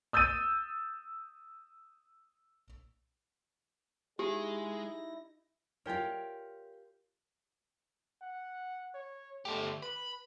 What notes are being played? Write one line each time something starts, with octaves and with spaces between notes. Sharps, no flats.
D#6 E6 G6 A6 D#7
G#3 D#4 E4 G4 G#4 A#6
F4 G4 A#4 C#5 G5
F#5
C#5
D3 A3 G4
B4 B5